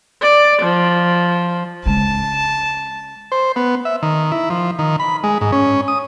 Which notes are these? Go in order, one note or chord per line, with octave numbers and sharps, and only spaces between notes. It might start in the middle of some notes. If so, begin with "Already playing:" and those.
D5
F3
C#3 G#3 A5
C5
B3
E5
D#3
E4
F3
D#3
B5
G#3
G#2
C#4
D#6